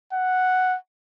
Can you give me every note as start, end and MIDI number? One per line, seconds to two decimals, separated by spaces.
0.13 0.77 78